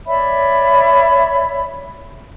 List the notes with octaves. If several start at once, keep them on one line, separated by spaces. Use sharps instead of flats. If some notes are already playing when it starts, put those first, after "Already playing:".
C#5 D5 E5 B5